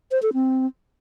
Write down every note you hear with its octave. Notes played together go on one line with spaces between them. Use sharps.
C5
A4
C4